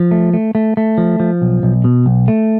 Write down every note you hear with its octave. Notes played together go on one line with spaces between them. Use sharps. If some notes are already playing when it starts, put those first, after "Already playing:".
Already playing: F3
A3
A3
A3
A3
F3
F3
B1
B1
B2
B1
A3